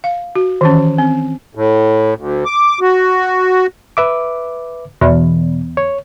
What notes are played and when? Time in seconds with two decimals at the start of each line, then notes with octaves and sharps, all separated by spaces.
0.04 F5
0.36 F#4
0.61 D#3 E3 C#4
0.98 C4
1.55 A2
2.16 D2
2.46 D6
2.81 F#4
3.97 B4 E5 D6
5.01 E2 B2
5.77 C#5